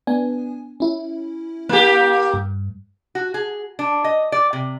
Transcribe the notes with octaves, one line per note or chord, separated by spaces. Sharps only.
B3 D4 G#5
C#4 E4
A#3 G4
G2
F#4
G#4
D4
D#5
D5
C3